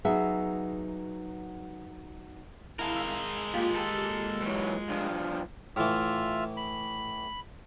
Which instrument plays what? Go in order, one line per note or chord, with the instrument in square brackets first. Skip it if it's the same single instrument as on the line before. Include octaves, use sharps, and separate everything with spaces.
[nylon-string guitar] F#3 B3 D#4 G#4 E5
[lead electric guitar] G#3 A#4 [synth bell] E4 F5 A5
[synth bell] E6 B6 C7
A#3 F4 G4
[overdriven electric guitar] A4
E3 F#3
G2 F3
[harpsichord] A2 E3 [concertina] F4 E5 F6
[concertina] B5